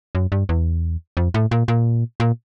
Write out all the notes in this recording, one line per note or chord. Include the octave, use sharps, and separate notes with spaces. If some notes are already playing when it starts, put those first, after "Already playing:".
F#2
G2
E2
F2
A2
A#2
A#2
A#2